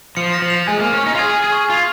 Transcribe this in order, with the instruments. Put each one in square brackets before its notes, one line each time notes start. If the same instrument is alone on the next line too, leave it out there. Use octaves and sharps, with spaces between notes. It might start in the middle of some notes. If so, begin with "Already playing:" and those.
[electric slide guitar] F3 [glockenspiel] C#7
[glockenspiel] A#6
[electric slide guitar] F3
[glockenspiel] F7
[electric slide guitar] G#3 [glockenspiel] G#5
[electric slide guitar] A#3
[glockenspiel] G#5
[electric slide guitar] C#4
[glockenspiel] F6
[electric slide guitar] D#4
F4
[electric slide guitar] G#4 [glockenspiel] G#6
[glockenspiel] F6
[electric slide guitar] G#4
[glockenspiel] C#6
[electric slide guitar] F4 [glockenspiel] G#6